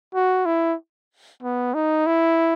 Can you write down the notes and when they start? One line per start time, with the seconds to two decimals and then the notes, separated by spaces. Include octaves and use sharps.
0.14 F#4
0.46 E4
1.43 B3
1.74 D#4
2.06 E4